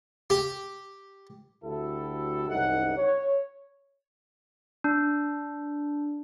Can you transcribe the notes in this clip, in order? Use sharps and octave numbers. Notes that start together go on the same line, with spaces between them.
G4
D2 E4 F#4 G4 A4
C2 F#2 C#3 D#4 G4 F#5
C#5
D4